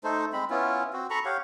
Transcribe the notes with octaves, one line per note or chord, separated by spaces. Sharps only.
A3 D#4 A4 C5
G#3 C4 B5
B3 C#4 E4 F4
C4 F#4
A4 A#5 B5 C#6
G4 C#5 F5 F#5